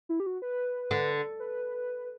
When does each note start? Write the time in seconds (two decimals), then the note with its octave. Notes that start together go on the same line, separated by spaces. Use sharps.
0.09 E4
0.20 G4
0.26 F#4
0.42 B4
0.91 D3
1.40 B4